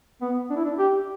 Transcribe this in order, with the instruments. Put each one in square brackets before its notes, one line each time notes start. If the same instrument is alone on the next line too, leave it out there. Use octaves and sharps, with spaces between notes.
[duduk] B3
D4
E4
D4
G4